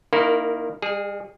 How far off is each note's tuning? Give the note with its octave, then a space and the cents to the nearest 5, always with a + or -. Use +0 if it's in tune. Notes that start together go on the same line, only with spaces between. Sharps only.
D#3 -25 A#3 +0 E4 +0
G3 +45 G#4 +0